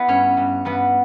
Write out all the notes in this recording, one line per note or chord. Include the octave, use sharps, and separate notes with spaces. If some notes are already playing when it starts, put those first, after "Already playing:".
Already playing: B3 E4 B4
G2 C#4 C#5
G2
G2 B3 B4